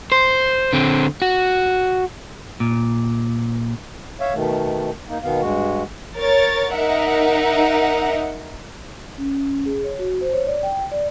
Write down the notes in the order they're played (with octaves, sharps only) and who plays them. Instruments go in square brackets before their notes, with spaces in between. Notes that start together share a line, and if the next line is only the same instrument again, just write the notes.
[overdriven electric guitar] C5
D3 C4
F#4
[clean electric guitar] A#2
[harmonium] C#5 E5 F5
B2 D#3 A3
A#3 D#4
B2 D#3 B3 F5
G2 G#3 F#4
[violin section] A#4 C#5 A6
D#4 A#4 E5 F#5
[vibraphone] C#4
C#4
G#4
C#5
F#4
C5
C#5
D5
G5
D5